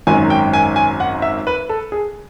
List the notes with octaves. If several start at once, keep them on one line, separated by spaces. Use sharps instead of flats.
G#1 F#2 D#3 F#3 G#5
G5
G#5
G#5
F#5
E5
B4
A4
G#4